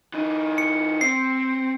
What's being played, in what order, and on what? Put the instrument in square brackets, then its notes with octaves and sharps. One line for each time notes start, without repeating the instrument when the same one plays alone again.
[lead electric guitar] E3 D#4
[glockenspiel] C#7
[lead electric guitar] C4 [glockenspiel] C7